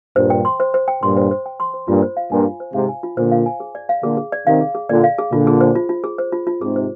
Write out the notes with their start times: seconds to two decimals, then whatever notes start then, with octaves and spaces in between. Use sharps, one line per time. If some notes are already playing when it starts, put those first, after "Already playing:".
0.16 G2 A#2 C5
0.30 G5
0.45 C6
0.60 C5
0.74 C5
0.88 G5
1.02 G2 A#2 C6
1.17 C5
1.31 C5
1.46 G5
1.60 C6
1.74 C5
1.88 G2 A#2 F4
2.02 C5
2.17 F5
2.31 G2 A#2 G#5
2.46 F4
2.60 C5
2.74 G#2 C3 F5
2.89 G#5
3.03 F4
3.17 A#2 D3 C5
3.32 F5
3.46 G#5
3.60 G#4
3.75 D5
3.89 F5
4.03 A#2 D3 G#4
4.17 G#4
4.32 D5
4.47 C3 D#3 F5
4.61 G#4
4.75 G#4
4.89 A#2 D3 D5
5.04 F5
5.18 G#4
5.32 A#2 D3 F4
5.47 G#4
5.61 C5
5.75 F4
5.89 F4
6.04 G#4
6.18 C5
6.32 F4
6.47 F4
6.61 G#2 C3 G#4
6.76 C5